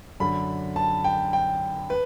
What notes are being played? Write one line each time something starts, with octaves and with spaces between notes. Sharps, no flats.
F#2 D3 B5
A5
G5
G5
B4